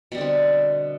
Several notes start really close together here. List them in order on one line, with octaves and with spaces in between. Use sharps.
B2 G3 D3 C4